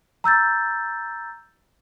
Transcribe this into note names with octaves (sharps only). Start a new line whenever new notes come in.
A#5 E6 G6 A6